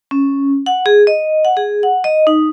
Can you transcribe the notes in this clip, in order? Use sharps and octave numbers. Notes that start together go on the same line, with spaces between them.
C#4
F#5
G#4
D#5
F#5
G#4
F#5
D#5
D#4